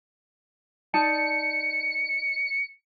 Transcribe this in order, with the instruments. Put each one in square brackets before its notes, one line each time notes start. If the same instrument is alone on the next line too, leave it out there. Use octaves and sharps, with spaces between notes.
[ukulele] D#4 D5 A5 [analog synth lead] C#7